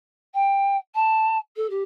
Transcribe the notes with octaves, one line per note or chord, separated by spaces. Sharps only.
G5
A5
A4
G4